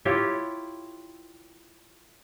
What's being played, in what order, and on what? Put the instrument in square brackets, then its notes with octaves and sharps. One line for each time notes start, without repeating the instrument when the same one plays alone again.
[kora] E4 F4 G4 C#5